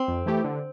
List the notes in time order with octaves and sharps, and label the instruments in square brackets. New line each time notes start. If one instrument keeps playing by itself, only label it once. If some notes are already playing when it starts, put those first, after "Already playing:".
Already playing: [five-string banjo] C4
[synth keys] F2
E3 A3 E4 G4
D3